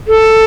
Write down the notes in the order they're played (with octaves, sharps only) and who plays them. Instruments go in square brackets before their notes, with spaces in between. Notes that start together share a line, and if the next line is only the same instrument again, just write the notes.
[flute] A4